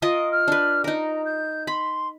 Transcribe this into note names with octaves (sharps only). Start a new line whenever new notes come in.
F4 A#4 D#5 D#6
F6
D4 B4
D#4 A#4 A#5
G6
B5 C6